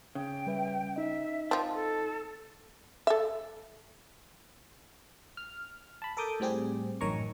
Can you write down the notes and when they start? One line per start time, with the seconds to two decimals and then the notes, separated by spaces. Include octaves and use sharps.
0.15 C#3 G5
0.47 G3 B4 E5
0.96 D#4 D#5 E5
1.51 F3 C4 A5
1.74 A4
3.07 A4 E5
5.37 F6
6.02 A5 B5
6.17 A4 A#4 D6 D#6 G6
6.40 A2 G3 C4 G4 G#4
7.01 A1 F#2 D#3 C#5 A#5 C#6